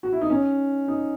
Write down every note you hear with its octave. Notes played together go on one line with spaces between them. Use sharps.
F#4
E4
D#4
C#4
D#4